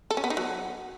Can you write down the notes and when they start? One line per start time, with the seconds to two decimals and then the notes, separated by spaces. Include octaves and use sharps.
0.11 A4
0.17 C#4
0.24 B3
0.30 D#4
0.37 F#3